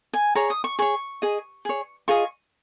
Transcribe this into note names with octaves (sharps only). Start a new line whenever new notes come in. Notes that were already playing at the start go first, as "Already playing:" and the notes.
G#5
G#4 C#5 A#5
D#6
C#6
G#4 C#5 C#6
G#4 D#5
G#4 C#5
F4 G#4 D#5 C#6